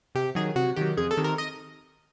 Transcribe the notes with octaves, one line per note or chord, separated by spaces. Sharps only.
C3 G4
D#3 F#3 G#4
C3 F#4
D#3 F#3 G4
F2 G#4
A4
C3 D#3
A#4
D#5